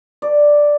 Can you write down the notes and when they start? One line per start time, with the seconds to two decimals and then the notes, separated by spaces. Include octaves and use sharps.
0.22 D5